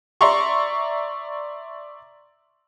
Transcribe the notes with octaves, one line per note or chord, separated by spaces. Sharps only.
D5 E5 A#5 C6 C#6